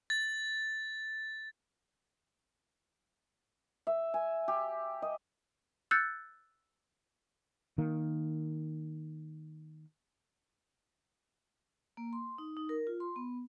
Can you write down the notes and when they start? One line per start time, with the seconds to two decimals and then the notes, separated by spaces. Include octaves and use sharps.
0.10 A6
3.87 E5
4.14 G#5
4.48 G4
5.02 D#5
5.91 E6 F#6 G6 A6 C#7
7.78 D#3 A#3
11.97 A#3
12.13 C6
12.38 D#4
12.57 D#4
12.69 A#4
12.87 F4
13.00 C6
13.16 B3